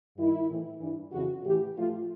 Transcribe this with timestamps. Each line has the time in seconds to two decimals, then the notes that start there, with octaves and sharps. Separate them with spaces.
0.16 G2 D#3 E4
0.49 A2 E3
0.80 G2 E3
1.12 F2 C#3 E3 F#4
1.44 A2 E3 G4
1.76 A2 F3 F4